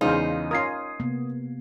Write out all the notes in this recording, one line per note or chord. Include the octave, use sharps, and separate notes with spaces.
E2 C#3 G#3 D#4 F4 C5 F5
C#4 F4 A#4 D#6 G#6 C7
C3 A#3 B3